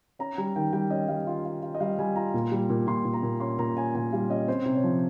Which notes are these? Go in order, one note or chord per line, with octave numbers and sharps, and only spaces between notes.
C#4 A#5
G3 A#5
D#3 G5
G3 G5
C#4 D#5
G3 F5
F4
F4
F4
D#5
G3 F5
G3 G#5
F4 A#5
A#2
G3
A#2
A#2 C6
A#2
A#5
A#2
C#4 C6
A#2 A#5
C#4 G#5
A#2 G#5
G3 F5
C#4 D#5
C4 C5
C3
C#5
F3